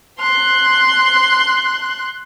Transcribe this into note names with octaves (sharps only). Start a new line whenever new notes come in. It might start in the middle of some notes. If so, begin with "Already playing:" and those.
C6 F#6